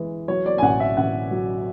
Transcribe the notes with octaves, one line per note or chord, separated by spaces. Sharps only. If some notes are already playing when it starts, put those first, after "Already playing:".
Already playing: E3 G#3
F#3 C#5
D5
G#5
A1 F#5
E5
A1 F#5
F#3